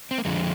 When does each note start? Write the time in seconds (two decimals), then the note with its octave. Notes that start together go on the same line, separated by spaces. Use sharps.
0.11 C4
0.18 A#3
0.25 F2 D3 F3 G#3